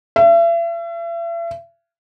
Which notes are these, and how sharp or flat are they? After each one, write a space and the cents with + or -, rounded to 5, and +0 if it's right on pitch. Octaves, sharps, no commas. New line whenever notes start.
E5 +40